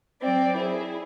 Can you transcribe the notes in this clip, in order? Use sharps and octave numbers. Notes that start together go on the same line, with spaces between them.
F#3 C4 D5
E4 G#4